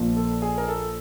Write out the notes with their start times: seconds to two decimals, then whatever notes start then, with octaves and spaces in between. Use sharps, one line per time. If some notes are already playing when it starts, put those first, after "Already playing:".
Already playing: A#1 A#2 F3 A#3
0.16 A4
0.42 G#4
0.58 A#4
0.68 A4